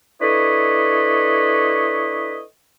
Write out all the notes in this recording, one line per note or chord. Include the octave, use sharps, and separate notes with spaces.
D4 E4 A4 B4 C#5 D#5